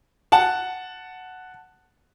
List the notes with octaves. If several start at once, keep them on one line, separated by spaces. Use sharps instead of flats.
F#5 A5